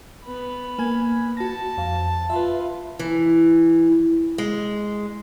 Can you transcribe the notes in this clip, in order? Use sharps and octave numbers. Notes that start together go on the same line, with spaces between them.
B3 B5
A#3 G#5 G#6
F#4 A5 A#6
F2 F5
F4 B4 E5
E3
G#3